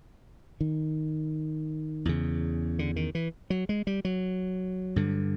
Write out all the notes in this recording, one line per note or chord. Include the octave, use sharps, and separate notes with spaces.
D#3
E2 C#3
D3
D#3
E3
F#3
G#3
G3
F#3
G2 D3